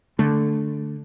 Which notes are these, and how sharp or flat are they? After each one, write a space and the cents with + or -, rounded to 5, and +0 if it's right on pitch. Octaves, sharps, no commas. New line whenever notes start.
D3 +0 A3 -5